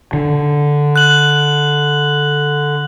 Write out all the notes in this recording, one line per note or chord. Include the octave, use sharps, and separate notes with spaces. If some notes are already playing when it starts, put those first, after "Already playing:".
D3
F#6 F#7